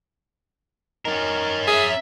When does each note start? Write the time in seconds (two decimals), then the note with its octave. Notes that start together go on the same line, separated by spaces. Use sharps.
1.05 D#3 C#4 A#4
1.67 G#4 E5